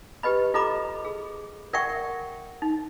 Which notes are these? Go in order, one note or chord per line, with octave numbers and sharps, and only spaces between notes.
G4 B4 D#5 B5
F4 A4 D#5 A#5 B5 D6
G#4
A#4 D5 E5 F#5 G5 C#6
D#4